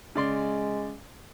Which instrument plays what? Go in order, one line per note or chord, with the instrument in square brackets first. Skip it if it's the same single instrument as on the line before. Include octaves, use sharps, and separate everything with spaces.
[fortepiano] C#3 D5 C6 [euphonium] G#3